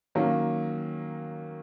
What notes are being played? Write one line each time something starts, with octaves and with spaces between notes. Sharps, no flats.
D#3 F#3 A#3 C#4